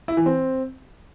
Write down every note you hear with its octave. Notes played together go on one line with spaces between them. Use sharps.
E4
E3
C4